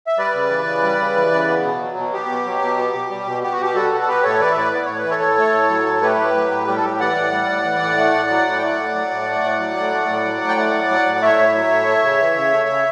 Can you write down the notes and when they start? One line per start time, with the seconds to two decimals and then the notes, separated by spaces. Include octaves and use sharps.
0.07 E5
0.18 G3 B4 D5
0.34 C#3
0.50 E3
0.67 C#3
0.83 G3
0.99 C#3
1.16 E3
1.32 C#3
1.48 B3
1.64 B2
1.81 F#3
1.97 B2
2.13 B3 G4
2.29 B2
2.45 F#3
2.61 B2
2.78 B3
2.94 B2
3.10 G3
3.26 B2
3.43 B3 G4
3.52 F#4
3.60 B2 G4
3.75 G3 F#4 A4
3.92 B2
4.01 A4
4.08 B3 G4 B4
4.23 A2 A4 C#5
4.40 E3 B4 D5
4.52 E5
4.56 A2 B4 D5
4.73 B3 D5
4.86 A2 C#5
4.98 B4
5.04 E3
5.10 A4 C#5
5.22 A2
5.38 A3
5.54 A2
5.70 F#3
5.86 A2
6.02 A3 G4 B4
6.19 A2
6.36 F#3
6.51 A2
6.67 G3 G4
6.77 A4
6.83 A2 G4
7.00 E3 D5 F#5
7.16 A2
7.32 G3
7.49 A2
7.65 E3
7.81 A2
7.98 A3
8.14 A2
8.30 F#3
8.46 A2
8.58 G5
8.62 A3 D5 F#5
8.79 A2
8.95 F#3
9.10 A2
9.27 A3
9.44 A2
9.59 F#3
9.77 A2
9.92 A3
10.09 A2
10.25 F#3
10.41 A2
10.48 G5
10.57 A3 D5 F#5
10.74 A2
10.90 F#3
11.06 A2
11.16 F#5
11.22 A3 C#5 E5
11.39 A2
11.55 F#3
11.71 A2
11.88 A3
12.04 C#3
12.20 E3
12.36 C#3
12.52 A3
12.68 C#3